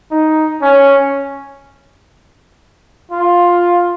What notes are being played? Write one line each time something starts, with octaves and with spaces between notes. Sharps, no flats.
D#4
C#4
F4